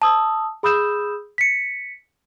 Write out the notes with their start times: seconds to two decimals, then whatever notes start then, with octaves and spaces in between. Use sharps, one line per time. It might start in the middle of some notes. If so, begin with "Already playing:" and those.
0.02 A5 D#6 E6
0.63 G#4 B5 D#6 E6 G6 E7
1.38 B6 C#7